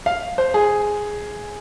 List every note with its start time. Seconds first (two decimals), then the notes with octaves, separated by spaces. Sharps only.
0.06 F5
0.38 C5
0.54 G#4